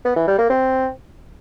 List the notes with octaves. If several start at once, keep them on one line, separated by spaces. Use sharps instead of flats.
B3
E3
G3
A#3
C4